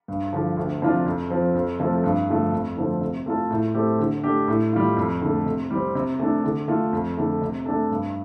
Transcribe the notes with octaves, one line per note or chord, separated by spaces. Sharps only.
G2
D3 F3
D2
C3 F3 D4 F4
F2
F3 C4
F2
C3 F3 A3 C4
G2
D3 F3 A3
F2
D3 F3 A3 C4
C3
A3 F4 A4
A2
A3 C4 G4
D3
A3 D4 G4
A2
G3 F4
F2
D3 A3
C3
G3 C4
C3
A3 D4
D3
A3 F4
F2
D3 A3
C3
A3 D4 A4
G2